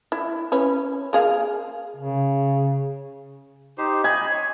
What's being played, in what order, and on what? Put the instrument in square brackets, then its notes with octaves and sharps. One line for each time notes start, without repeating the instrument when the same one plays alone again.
[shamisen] E4
C#4 B4
A#3 G#4 F5
[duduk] C#3
[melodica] D#4 G4 C5
[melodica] D#5 B5 [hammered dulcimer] G#5
[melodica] C#5